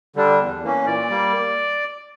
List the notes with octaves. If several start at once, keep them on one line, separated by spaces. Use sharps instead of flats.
D3 G3 D4
E2
E3 A#3 C#4
A#2 D5
G3 A#3